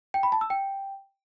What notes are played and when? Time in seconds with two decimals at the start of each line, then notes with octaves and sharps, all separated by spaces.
0.14 G5
0.23 B5
0.32 A5
0.41 E6
0.50 G5